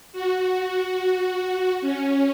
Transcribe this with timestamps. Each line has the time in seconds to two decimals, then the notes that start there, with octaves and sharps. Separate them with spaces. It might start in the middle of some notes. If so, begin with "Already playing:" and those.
0.12 F#4
1.81 C#4